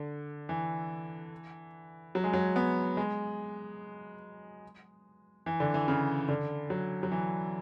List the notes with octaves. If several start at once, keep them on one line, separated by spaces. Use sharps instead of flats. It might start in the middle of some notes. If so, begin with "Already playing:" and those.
Already playing: D3
E3
F#3
G#3
F#3
B3
G#3
E3
D3
E3
C#3
D3
F#3
F#3
E3